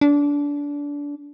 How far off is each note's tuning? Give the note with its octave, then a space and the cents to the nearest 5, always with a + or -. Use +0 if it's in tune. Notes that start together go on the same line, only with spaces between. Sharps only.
D4 -25